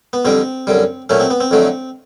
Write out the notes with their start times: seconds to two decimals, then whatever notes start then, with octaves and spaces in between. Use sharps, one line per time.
0.13 B3
0.25 F2 D3 G3 C4
0.67 F#2 D3 G3
1.10 A#2 F#3 A3 C#4
1.20 C4
1.30 B3
1.40 C4
1.51 F2 D3 F#3 A3